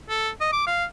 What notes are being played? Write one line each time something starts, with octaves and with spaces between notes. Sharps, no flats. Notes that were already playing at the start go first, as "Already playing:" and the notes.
A4
D#5
D6
F5